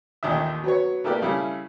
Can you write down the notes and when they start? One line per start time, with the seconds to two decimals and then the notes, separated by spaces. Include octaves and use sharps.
0.23 A1 D#2 A#2 D#3 D4 E5
0.64 F#3 B3 C#5
1.04 A3 A#3 E4 G4 B4 D5
1.22 C#3 G3 A3 E4